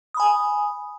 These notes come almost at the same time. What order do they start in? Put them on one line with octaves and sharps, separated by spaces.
D#6 B5 G#5